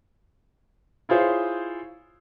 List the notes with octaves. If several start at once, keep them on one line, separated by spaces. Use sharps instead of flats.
E4 F4 G#4 C5 C#5